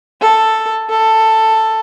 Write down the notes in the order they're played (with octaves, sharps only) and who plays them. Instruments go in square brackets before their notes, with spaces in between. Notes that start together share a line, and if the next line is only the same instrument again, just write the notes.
[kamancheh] A4
A4